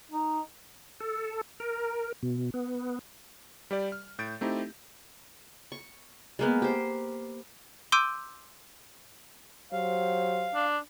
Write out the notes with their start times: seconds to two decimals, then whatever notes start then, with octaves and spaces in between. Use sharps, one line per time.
0.11 D#4
1.00 A4
1.60 A#4
2.23 B2
2.54 B3
3.71 G3 G4 D5
3.92 F6
4.19 A2 G6 A6 D7
4.41 A3 C4 D#4 E4 G4
5.72 C#6
6.39 G#3 A#3 B3
6.62 G4 C5
7.92 C6 D6 E6 G6 D7 D#7
9.73 F#3 G4 C5 F5
10.55 D4